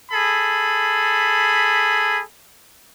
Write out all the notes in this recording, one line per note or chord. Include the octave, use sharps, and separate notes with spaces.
G#4 A4 B5